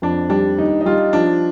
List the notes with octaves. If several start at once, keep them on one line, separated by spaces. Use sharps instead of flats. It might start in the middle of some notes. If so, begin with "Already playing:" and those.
F2 D4
G3 D4
D#2 D#4
D#4
G3 F4
F3 D4